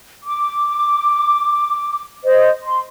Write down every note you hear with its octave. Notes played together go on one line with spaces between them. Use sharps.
D6
C5 D#5
C6